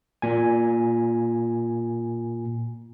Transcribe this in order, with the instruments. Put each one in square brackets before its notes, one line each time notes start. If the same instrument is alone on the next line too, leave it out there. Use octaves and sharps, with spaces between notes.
[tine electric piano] A#2 G#5